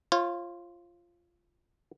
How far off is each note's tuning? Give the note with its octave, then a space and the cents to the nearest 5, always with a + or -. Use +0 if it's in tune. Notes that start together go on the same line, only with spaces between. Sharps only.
F4 -10 C#5 -45